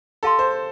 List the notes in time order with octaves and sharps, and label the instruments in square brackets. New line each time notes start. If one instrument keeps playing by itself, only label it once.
[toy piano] G4 F5 A5 C6 [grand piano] A4
[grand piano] C5